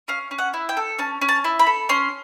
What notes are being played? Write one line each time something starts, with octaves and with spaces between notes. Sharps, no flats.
C#4 F5
C#4
F#5
E4
G5
A4
C#4 A5
C#4
A5
E4
B5
A4
C#4 C6